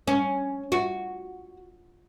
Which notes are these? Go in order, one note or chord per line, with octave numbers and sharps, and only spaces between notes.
C#4
F#4